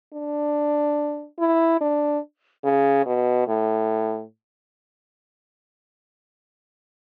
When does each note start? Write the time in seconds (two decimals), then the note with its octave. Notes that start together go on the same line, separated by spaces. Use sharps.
0.13 D4
1.39 E4
1.81 D4
2.64 C#3
3.06 B2
3.48 A2